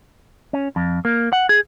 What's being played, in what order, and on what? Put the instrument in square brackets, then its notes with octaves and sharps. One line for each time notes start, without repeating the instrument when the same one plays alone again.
[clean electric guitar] C#4
F2
A#3
F#5
G#4